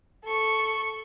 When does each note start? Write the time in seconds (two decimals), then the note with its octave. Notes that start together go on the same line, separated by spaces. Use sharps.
0.24 A4 C#6